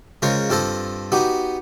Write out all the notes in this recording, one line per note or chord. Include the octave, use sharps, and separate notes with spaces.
C#3 G#3 F4 A#4 C5 C#5
G2 C4 F4 A4 C5 D#5
B3 D#4 F#4 G4